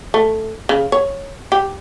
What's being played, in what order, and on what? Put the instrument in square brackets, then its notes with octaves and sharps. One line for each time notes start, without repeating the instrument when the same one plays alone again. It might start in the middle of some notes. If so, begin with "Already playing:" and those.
[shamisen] A3
C#3
C#5
G4